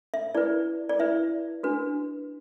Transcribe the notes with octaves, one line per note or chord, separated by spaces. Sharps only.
E5
E4 B4 D5
D5
E4 B4 E5
D4 F#4 B4